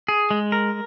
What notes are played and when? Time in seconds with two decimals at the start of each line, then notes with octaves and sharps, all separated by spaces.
0.08 G#4
0.31 G#3
0.52 A#4